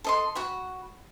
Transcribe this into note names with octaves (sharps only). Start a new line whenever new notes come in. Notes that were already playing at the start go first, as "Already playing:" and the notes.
A4 D#5 C6
F#4 F#5 B5